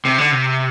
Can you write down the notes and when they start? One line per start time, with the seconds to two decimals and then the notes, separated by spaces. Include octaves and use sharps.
0.05 C3
0.18 D3
0.32 C3